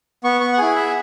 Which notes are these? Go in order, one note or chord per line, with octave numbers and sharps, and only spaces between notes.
B3 C#6
C#6
F#5
E4 G#4 G#5
E5